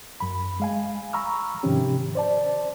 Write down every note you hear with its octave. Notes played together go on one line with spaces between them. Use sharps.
F#2 B5
G#3 F5 G#5
A#5 B5 C#6 E6 F6
G#2 C3 D#3 F3 C#4 G4
C5 D5 A5